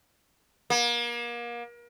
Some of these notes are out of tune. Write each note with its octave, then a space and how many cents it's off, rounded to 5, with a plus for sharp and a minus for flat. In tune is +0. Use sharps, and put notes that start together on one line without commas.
A#3 +35